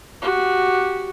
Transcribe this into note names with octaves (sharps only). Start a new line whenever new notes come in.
F#4 G4